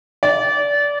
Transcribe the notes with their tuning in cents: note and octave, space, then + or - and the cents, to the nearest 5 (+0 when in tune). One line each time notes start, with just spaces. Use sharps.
D5 -25